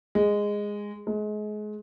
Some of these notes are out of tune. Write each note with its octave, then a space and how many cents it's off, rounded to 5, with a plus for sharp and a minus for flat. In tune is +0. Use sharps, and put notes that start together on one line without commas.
G#3 -10
G#3 +30